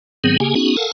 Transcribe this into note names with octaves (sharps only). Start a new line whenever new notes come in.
G#2 D#3 F#3 B3 C4 G#4
C#3 A#3 G4 G#4 G#5
B3 C#4 D#4 F#4 G#4
A4 A#4 F5 F#5 G#5 A5